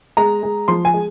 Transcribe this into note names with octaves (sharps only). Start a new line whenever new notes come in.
G#3 A#5
G#3
F3 C6
G#5
G#3